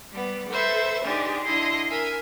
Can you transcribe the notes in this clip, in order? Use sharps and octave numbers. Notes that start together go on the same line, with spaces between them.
G3 B3
A4 B4 C5 E5
G#3 D4 D#4 G4
D3 E4 D#5 C6
A#4 E5 G#5